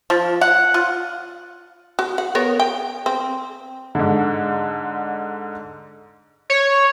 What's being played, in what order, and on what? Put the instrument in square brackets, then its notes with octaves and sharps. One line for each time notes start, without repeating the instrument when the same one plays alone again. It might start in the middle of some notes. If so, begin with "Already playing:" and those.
[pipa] F3
F#5
F4
[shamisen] F#4
F#5
B3 A#4 C#5
G5
C4
[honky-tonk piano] G#2 D3
[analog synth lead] C#5